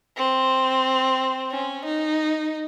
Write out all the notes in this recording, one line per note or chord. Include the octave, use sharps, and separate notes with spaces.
C4
C#4
D#4